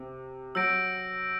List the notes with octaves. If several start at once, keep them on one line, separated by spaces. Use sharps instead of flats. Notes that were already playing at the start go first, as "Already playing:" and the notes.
Already playing: C3
F#3 E6 G6 A#6 D7